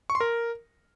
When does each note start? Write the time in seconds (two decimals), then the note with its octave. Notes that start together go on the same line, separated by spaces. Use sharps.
0.10 C#6
0.15 C6
0.20 A#4